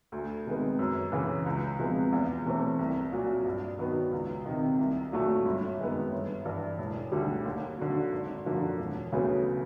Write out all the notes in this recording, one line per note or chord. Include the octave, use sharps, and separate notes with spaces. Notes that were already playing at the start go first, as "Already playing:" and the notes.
D2
C3 D#3 G#3 B3
F#2
C#3 E3
C#2
C3 F3 G#3 B3
E2
C3 E3 A3 C4
C2
A#2 F#3
G2
D#3 F#3 B3
C#2
C3 D#3
C2
A#2 F#3 A3
G1
F#2 D#3 G#3 B3
G1
G2 E3
E1
D2 D3 G3
D#2
D3 F#3
G#1
F#2 D3 F3 A#3
E1
D2 C#3 F#3 B3